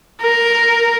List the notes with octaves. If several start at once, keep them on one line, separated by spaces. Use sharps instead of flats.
A#4